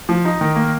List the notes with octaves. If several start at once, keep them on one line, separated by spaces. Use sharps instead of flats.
F3
D#4
D#3
A#3